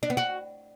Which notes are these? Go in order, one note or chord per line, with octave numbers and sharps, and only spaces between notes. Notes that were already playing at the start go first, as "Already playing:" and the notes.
D4
B3
F#4